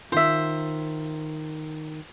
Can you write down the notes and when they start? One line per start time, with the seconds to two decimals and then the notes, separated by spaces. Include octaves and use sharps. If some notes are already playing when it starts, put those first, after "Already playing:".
0.12 D#3 F4 C5 E5